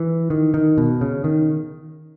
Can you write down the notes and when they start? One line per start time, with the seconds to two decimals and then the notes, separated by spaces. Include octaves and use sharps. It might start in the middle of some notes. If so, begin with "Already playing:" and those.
Already playing: E3
0.30 D#3
0.54 D#3
0.78 B2
1.01 C#3
1.24 D#3